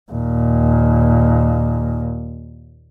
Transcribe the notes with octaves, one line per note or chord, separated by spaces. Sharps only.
D#2 A#2